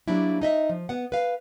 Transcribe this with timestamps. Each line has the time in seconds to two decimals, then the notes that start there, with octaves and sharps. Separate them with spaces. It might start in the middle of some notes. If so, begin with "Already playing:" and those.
0.08 F#3 G3 A#3 D4 E4
0.42 D#4 D#5 E5
0.69 F3
0.89 B3 F#5
1.12 B4 F5